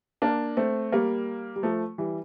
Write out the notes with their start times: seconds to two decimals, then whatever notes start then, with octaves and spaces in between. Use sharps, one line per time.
0.22 A#3 D4
0.57 A3 C4
0.92 G3 A#3
1.56 G3
1.63 F3 A3
1.98 E3 G3